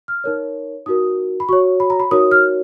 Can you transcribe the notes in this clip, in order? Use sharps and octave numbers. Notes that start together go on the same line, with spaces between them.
F6
D#4 A#4 C#5
D#4 F#4 A#4 D#6
B5
F#4 C#5 C#6
B5
A#5
B5
D#4 F#4 A#4 C#5 D#6
F6